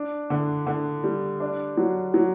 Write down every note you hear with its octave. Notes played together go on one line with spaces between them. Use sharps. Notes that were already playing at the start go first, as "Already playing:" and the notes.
Already playing: D4
D3
D3
G3
D4
F#3
F#3